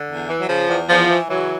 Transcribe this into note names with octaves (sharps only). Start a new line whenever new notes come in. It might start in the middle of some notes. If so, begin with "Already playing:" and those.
Already playing: D3
E2
E3
F#3
C#3 F3
E2
E2 F3
E3
C#3 E3 F#3